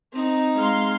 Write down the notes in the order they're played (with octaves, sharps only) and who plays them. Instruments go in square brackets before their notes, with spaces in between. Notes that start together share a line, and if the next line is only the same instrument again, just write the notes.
[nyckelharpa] C4 D#4
[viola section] G#3 F5 C6